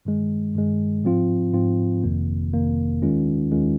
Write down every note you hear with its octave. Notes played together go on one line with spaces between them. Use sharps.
G2 D#3 G#3
G2 D#3 G#3
G#2 F3 C4 F4
G#2 F3 C4 F4
G1 F2 C3 D#3 A#3
G1 F2 C3 D#3 A#3
D#2 D#3 G#3 C#4 F4
D#2 D#3 G#3 C#4 F4